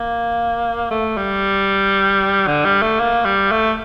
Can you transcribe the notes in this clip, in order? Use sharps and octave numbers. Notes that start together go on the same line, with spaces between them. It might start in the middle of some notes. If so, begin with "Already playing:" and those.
Already playing: A#3
A3
G3
D3
G3
A3
A#3
G3
A3